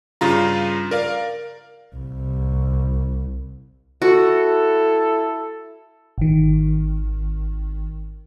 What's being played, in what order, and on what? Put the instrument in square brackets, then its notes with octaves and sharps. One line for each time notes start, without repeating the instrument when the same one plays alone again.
[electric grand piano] G2 C#3 F4 A#5
A#4 D5 F5
[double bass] C2
[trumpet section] E4 A4 [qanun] F#4
[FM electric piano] G#1 D#3